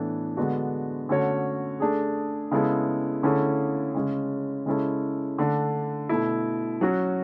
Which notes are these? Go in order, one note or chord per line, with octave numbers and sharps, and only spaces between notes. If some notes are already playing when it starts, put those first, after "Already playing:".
Already playing: A2 E3 B3 D4 A4
D3 G#3 B3 D4 F#4
D3 A3 C#4 F#4 C#5
A3 D4 G#4
C#3 G#3 B3 E4 A4
D3 A3 C#4 E4 G#4
C#3 G#3 C#4
C#3 G#3 C#4 E4 A4
D3 A3 D4
B2 A3 E4
F#3 C#4 F#4